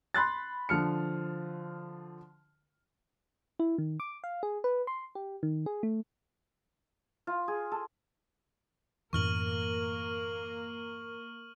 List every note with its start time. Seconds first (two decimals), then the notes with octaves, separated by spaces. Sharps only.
0.14 B5 C6 F#6 A6
0.69 D3 F3 F6 C#7
3.59 E4
3.78 D#3
4.00 D6
4.24 F5
4.43 G#4
4.64 B4
4.87 C6
5.15 G4
5.43 D#3
5.66 G#4
5.83 A3
7.27 F4
7.48 G#4
7.72 A4
9.13 F#2 A2 E3 A#3 A#4 C#6 F6 F#7